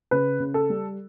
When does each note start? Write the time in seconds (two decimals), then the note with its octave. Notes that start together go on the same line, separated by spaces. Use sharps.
0.11 C#3 B4
0.40 C#3
0.54 A4
0.70 G3